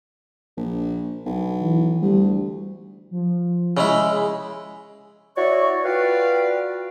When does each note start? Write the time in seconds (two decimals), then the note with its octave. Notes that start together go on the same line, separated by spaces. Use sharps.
0.57 A#1
1.26 B1
1.62 E3
2.02 D2 G3
3.11 F3
3.77 C#3 G#3 E4
4.09 G#4
5.36 E4 F#4 C#5 D5 C#6
5.85 F4 F#4 B4 D5 F5 G5